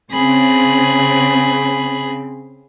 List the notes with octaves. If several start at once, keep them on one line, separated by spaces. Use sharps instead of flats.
C#3 C4 G#4 B5